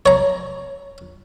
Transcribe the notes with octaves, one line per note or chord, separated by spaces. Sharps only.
C#5 A#5